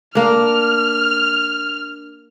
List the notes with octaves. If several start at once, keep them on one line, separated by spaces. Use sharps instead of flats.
A#3 D4 F6